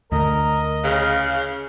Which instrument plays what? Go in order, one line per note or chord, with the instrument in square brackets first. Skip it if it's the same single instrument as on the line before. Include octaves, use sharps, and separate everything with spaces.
[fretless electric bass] D2 D3 A3 [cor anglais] A#4 [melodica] D#5
[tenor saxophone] C#3 [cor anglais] F5